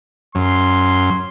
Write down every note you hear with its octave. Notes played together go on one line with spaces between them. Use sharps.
F#2 C6